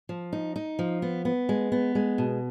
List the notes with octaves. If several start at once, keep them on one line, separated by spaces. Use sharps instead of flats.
F3
D#4
D#4
F3
B3
B3
G#3
B3
G#3
B2